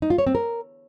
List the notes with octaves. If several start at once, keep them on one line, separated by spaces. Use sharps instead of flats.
D#4
F4
C#5
C4
A#4